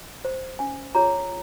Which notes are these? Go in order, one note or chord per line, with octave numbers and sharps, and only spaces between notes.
C5
C#4 G#5
F4 G#4 C#5 A#5